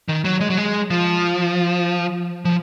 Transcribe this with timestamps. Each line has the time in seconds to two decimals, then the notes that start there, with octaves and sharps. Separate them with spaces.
0.09 D#3
0.25 F#3
0.41 G#3
0.50 F#3
0.57 G#3
0.90 F3
2.45 F3